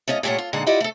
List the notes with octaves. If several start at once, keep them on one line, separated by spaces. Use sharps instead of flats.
A3 C#4 F4 D#5
A#2 G3 A3 F4 C#5 F#5
F4
A#2 D3 G#3 D#4 F#5
E4 F4 G4 D5 D#5 F#5
A3 A4